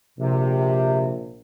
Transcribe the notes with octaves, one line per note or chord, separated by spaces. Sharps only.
A#1 C3